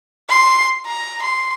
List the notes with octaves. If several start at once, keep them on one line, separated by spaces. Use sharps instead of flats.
C6
A#5
C6